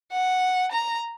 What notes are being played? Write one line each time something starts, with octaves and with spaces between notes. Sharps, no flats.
F#5
A#5